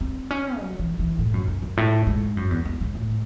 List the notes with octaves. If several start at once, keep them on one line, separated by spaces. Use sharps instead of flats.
C4
C#4
F#3
E3
E3
A2
F#2
F#2
F#2
A2
G#2
F#2
E2
E2
G#2
A2